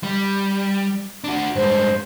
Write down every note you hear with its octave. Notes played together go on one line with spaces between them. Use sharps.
G3
D4 F#4
G2 G#3 C5